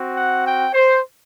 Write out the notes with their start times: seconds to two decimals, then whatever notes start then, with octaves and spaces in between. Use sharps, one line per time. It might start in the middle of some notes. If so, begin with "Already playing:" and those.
Already playing: C4 F#4
0.15 F#5
0.45 G5
0.73 C5